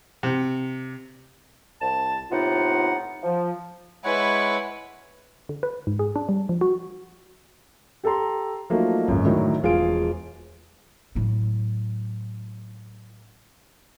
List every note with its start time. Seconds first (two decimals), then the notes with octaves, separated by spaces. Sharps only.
0.23 C3
1.82 C2 A5
2.31 A2 C3 B3 D#4 F4 F#5
3.23 F3
4.04 G#3 E4 B4 C#5 F#5
5.49 D3
5.63 B4
5.87 G#2
5.99 G#4
6.16 D4
6.29 G3
6.49 F3
6.61 F#4
8.04 G4 A4 G5 A#5 C6
8.70 F3 F#3 A3 A#3 D#4 F#4
9.08 G#1 C#2 F#2
9.25 A2 D3 D#3 F#3
9.63 E1 F3 F4 G#4 F5 D7
11.15 A2 F#3